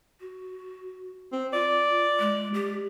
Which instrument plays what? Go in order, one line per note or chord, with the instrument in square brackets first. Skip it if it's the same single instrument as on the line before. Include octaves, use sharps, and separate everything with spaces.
[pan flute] F#4
[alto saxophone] C4
[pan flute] F4 [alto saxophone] D5
[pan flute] G#3
G4